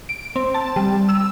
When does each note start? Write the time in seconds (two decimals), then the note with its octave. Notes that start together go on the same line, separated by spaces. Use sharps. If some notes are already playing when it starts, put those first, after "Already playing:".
0.09 D7
0.36 C4
0.54 A5
0.76 G3
1.09 E6